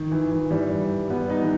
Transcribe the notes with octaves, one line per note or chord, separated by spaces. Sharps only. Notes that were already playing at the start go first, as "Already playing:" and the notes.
Already playing: D#3
E3
E3
E3 G3
G3 B3
B3 D#4
E3